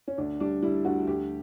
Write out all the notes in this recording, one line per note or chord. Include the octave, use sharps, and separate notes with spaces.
C#4
D2 D4
G3 D4
G3 E4
D2 F#4
D2 G4